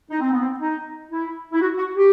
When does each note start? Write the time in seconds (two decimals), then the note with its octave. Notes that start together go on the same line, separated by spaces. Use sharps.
0.10 D#4
0.20 C4
0.32 B3
0.41 C4
0.60 D#4
1.12 E4
1.52 E4
1.61 F#4
1.78 F#4
1.96 G4